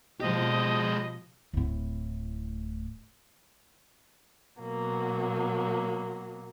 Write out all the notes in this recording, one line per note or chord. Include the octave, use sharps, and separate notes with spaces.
B2 F3 G#3 G4 D#5
D1 A2
B2 F#3 A#3